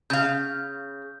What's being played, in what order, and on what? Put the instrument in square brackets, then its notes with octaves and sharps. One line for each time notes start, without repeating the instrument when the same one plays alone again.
[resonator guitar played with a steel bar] C#3 F5 [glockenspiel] G6